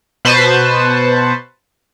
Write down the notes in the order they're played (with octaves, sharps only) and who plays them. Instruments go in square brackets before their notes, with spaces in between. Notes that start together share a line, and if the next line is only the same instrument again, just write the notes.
[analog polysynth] B2 B4 C5 A5 C#6